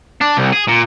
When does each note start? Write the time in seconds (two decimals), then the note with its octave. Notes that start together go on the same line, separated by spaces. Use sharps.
0.21 D4
0.37 C2
0.52 G#4
0.68 A#2